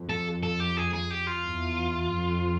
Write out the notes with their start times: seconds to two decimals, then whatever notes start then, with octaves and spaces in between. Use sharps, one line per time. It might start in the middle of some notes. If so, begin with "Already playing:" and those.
Already playing: F2
0.09 A4
0.43 A4
0.60 G4
0.77 G#4
0.93 G#4
1.10 G4
1.27 F4
1.44 E2
2.12 F2